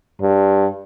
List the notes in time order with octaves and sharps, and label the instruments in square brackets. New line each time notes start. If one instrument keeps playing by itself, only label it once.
[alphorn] G2